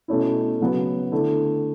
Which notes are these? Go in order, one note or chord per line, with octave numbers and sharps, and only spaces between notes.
B2 A3 C#4 E4
C#3 F#3 B3
D3 A3 E4